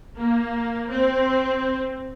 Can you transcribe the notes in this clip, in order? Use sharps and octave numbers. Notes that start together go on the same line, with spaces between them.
A#3
C4